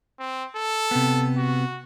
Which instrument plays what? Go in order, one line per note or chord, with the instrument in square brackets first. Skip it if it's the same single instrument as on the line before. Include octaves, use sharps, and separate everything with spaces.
[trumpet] C4
A4
[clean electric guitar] C3 B3
[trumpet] F#4